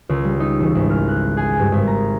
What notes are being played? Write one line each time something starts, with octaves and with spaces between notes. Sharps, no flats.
C#2
G3
D#4
E1
G#1
F6
F#6
G#4
G2
G#1
A#5